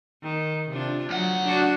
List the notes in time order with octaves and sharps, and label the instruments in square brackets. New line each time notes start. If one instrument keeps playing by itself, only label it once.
[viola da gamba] D#3
C3 D4 F4
[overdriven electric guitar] D2 F#5 [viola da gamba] F#3
[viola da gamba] D4 F#4